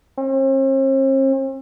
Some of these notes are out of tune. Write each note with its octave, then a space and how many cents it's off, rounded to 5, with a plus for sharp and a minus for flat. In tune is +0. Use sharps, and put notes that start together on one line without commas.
C4 +45